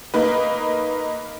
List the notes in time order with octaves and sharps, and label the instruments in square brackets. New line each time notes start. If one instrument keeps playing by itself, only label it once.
[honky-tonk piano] A#3 D#4 B4